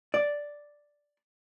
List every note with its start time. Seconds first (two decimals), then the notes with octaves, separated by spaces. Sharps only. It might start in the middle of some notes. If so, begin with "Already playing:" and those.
0.14 D5